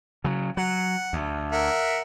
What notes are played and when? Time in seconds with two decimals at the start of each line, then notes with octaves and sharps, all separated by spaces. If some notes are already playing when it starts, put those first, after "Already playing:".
0.24 C#3 F#3
0.57 F#3 F#5
1.13 D2
1.52 A#4 E5 F#5